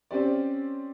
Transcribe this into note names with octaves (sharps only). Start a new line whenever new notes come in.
C4 C#4 G4 D5